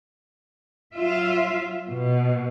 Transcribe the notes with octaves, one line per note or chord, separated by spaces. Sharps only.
F#3 F4 E5
B2